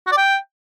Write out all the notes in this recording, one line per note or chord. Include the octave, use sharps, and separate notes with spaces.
F#4
D5
G5